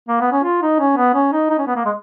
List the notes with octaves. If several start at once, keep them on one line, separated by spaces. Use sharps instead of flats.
A#3
B3
C#4
F4
D#4
C#4
B3
C#4
D#4
D#4
C#4
B3
A#3
G#3